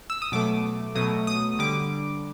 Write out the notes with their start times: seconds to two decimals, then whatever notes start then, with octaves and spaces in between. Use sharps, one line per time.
0.10 E6
0.22 D#6
0.32 B2 F#3 A3 D6
0.95 B2 F#3 A3 D#6
1.27 D#6
1.59 D3 G3 D6